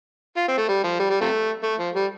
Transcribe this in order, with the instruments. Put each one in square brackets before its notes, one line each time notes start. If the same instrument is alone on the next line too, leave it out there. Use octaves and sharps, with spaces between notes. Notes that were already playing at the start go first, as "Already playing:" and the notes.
[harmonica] F4
C4
A3
G3
F3
G3
G3
C3 F3 A3
A3
F3
G3